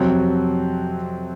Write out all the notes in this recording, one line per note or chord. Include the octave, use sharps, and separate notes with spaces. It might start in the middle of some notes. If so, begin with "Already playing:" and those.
Already playing: F2 C3 F#3 C4